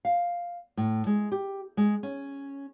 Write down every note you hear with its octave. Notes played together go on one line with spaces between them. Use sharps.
F5
A2
G#3
G4
G#3
C#4